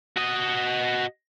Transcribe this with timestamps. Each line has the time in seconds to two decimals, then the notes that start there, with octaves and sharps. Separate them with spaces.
0.17 F#4 D#5